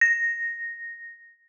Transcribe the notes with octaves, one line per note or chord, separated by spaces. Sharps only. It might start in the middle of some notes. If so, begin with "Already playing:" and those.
A#6